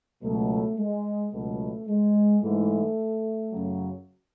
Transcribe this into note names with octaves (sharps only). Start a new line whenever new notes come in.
C#2 B2 F#3 A3
G#3
C#2 B2 F#3 A3
G#3
G#2 E3 A3
F#2 C#3 F#3